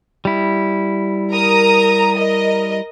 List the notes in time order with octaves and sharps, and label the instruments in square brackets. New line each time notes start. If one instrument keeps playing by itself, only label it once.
[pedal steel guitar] G3 E4
[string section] A#4 A#5 D#6
A#4 D#5